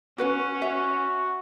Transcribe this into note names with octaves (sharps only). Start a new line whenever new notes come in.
C#4 F#4 B4 F#5
F#4 E5